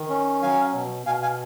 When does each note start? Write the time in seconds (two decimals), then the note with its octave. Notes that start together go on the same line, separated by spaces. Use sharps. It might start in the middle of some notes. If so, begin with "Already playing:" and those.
Already playing: D#3
0.09 C#4
0.42 F#3 F5 G#5
0.74 B2
1.06 B2 F5 G#5
1.22 F5 G#5